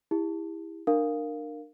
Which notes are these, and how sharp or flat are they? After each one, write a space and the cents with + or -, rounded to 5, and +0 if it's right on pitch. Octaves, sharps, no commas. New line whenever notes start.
E4 -5 G4 +40
D4 +35 A#4 -10 F5 +0